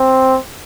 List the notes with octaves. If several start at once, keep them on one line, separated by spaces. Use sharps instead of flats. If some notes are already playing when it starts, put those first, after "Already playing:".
Already playing: C4